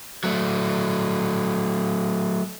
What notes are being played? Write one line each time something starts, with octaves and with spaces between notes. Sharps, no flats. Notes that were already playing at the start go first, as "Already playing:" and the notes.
F#3 A3